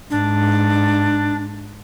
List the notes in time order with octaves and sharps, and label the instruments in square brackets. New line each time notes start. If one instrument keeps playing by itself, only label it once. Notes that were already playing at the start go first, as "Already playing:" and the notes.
[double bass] G#2 [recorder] D4